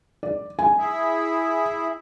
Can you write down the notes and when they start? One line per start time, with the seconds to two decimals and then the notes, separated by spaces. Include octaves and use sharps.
0.23 D5
0.59 C3 G#5
0.78 E4 G#4 E5